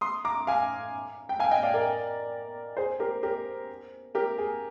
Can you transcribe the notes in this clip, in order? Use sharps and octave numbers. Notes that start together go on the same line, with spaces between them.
C6 D#6
A#5 D6
F5 G#5
G5
F5 G#5
D#5 G5
D5 F5
A#4 D5
G#4 C5
G4 A#4
G4 A#4
G4 A#4
G#4